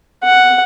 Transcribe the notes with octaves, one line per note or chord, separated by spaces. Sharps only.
F#5